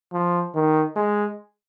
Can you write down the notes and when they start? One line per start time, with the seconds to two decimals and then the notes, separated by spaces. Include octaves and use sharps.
0.13 F3
0.55 D#3
0.96 G#3